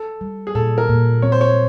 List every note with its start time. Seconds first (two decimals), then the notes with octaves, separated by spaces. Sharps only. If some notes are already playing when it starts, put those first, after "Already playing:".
Already playing: A4
0.21 G3
0.47 G#4
0.55 A#2 A4
0.78 A#4
0.89 A#2
1.22 C4 C#5
1.32 C5
1.41 C#5